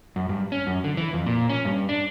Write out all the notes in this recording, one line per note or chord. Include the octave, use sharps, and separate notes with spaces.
F#2
G2
C#4
F#2
D3
E3
F2
A#2
C#4
G2
D4